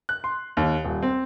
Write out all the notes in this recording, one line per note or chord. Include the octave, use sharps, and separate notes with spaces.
F#6
C6
D#2
D#1
C4